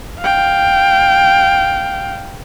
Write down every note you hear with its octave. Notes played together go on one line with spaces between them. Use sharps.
F5 G5